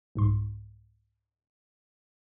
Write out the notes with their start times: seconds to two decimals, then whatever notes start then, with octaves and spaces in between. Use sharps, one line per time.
0.15 C2 G#2 C6